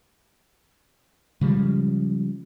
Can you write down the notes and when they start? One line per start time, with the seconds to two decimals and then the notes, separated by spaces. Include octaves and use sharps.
1.41 C#3 F3 G3 G#3